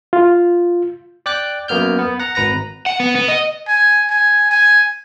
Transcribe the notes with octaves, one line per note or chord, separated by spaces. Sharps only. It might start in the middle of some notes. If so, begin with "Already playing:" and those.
F4
D5 G5 D6 F#6
F#2 A#3 B3 F6 G6
B3
F#5 A#5
G#1 B4 A#5 A#6
F#5
B3
B3
D#5
G#5
G#5
G#5